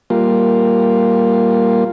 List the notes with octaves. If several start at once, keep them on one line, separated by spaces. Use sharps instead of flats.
G3 A#3 F4